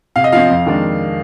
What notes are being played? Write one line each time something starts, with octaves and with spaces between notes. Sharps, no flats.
C3 F5
D#5
F3 C4 F5
F2
D#3 G#3 D4